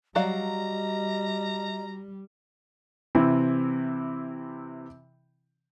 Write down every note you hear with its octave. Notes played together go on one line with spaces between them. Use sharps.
F#3 G3 D5 D#5 F5 A#5
C3 E3 C4 E4